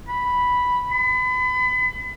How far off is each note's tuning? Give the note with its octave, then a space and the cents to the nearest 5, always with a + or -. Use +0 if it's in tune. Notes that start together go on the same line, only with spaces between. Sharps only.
B5 -5
B5 +35